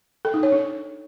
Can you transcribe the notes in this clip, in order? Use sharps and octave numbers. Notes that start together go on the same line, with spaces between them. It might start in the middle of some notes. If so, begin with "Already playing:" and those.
A4
D#4
C#5
D4